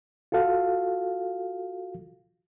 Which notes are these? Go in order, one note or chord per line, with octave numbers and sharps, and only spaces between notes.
F4 F#4 A4 F5